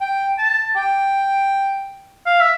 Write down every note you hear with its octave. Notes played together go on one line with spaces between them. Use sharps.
G5
A5
G5
F5
E5